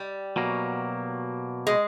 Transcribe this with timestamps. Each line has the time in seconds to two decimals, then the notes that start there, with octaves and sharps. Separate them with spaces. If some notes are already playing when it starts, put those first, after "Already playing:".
Already playing: G3
0.36 B2 F#3 A#3
1.67 G#3